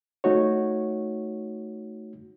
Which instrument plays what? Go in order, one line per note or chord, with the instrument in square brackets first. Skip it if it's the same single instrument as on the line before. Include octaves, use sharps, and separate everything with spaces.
[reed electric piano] A3 D#4 F#4 C#5